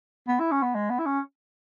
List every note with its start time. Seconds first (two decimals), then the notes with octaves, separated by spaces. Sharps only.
0.28 B3
0.40 E4
0.51 C#4
0.63 B3
0.75 G#3
0.90 B3
0.99 E4
1.06 C#4